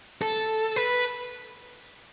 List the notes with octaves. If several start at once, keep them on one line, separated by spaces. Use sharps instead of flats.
A4
B4